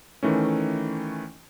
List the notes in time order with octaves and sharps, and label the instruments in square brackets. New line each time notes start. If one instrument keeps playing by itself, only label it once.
[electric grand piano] D#3 E3 A3 C#4